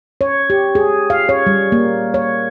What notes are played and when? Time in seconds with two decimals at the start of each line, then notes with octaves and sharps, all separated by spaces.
0.21 C#5
0.50 G4
0.75 G#4
1.10 F5
1.29 C#5
1.47 G3
1.72 A#3
2.14 C#5